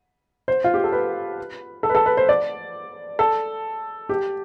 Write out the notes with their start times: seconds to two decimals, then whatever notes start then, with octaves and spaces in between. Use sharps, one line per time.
0.48 C5
0.64 F4
0.74 G4
0.84 A4
0.92 B4
1.83 A4
1.89 B4
1.95 A4
2.06 B4
2.17 C5
2.29 D5
3.19 A4
4.09 G4